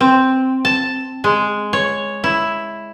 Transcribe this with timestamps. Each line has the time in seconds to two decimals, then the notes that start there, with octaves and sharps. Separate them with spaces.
0.01 C4
0.65 A5
1.24 G#3
1.73 C#5
2.24 E4